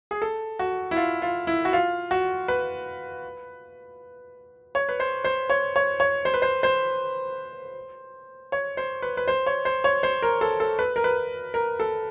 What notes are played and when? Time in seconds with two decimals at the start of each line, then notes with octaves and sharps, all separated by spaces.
0.11 G#4
0.22 A4
0.59 F#4
0.91 E4
0.96 F4
1.22 F4
1.47 E4
1.65 F#4
1.73 F4
2.11 F#4
2.48 B4
4.75 C#5
4.89 B4
5.00 C5
5.24 C5
5.50 C#5
5.76 C#5
6.00 C#5
6.25 C5
6.34 B4
6.42 C5
6.63 C5
8.52 C#5
8.77 C5
9.02 B4
9.17 B4
9.28 C5
9.46 C#5
9.65 C5
9.84 C#5
10.03 C5
10.22 A#4
10.41 A4
10.60 A4
10.79 B4
10.96 A#4
11.04 B4
11.54 A#4
11.80 A4